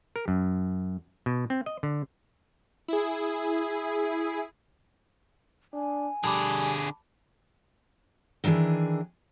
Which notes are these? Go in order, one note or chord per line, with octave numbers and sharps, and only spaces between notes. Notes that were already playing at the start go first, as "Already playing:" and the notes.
A#4
F#2
B2
C4
D#5
D3
E4 G#4
D4 G#5
D3 G3 G#4 A5 B5 D6
D#3 E3 D4 E4 G#4